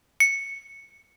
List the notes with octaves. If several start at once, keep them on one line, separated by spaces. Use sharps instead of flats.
C#7